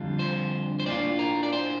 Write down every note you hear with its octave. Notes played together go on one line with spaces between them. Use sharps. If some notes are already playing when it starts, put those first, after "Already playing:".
Already playing: F2 D3 G3 D4 F4
C5
C5
A2 G3 A#3 D4 F4 D5
A#4
D5
C5